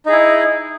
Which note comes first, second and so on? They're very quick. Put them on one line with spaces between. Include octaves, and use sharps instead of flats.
D#4 G#4 E4